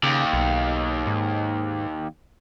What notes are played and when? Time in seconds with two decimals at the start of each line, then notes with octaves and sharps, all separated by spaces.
0.03 D#2 C#3
0.33 B1
1.07 G#2